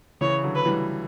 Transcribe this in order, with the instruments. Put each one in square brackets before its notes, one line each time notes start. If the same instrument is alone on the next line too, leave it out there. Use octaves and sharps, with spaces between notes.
[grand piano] C#3 E3 [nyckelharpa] C#5
[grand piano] D3 F#3
[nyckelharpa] B4
[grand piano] E3 G3